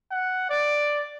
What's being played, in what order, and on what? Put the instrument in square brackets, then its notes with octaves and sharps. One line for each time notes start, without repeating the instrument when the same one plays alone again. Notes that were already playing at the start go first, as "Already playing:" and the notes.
[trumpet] F#5
D5